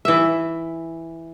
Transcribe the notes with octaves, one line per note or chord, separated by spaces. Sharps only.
E3 E5